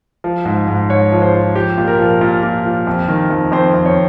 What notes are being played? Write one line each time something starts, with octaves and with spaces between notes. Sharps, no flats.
F3
G#2
G#2
G#2 C#5
F3
C5
F3
F3 G4
A#2
A#4
F3
A#2
A#2
F3
F2
D#3
F2
F2 C5
F2
C#5